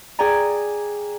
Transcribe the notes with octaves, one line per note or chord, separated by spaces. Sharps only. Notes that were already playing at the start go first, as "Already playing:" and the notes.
G#4 D5 G5 G#5 A#5